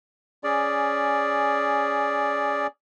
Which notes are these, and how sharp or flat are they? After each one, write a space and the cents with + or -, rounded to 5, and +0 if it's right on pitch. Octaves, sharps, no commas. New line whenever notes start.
C#4 +5 G#4 +0 D5 +0